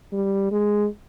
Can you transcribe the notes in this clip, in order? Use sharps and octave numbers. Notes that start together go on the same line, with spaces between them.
G3
G#3